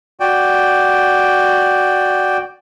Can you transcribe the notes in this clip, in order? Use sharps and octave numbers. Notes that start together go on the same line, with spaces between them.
F#4 D5 G5